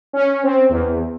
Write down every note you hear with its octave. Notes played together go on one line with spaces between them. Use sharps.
C#4
C4
E2